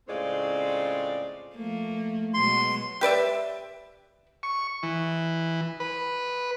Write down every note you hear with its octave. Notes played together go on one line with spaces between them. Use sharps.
A2 C#3 G#3 C4 F4 D5
F3 A3 A#3
B2 F#3 G#3 C6
G4 B4 D5 E5
C#6
E3
B4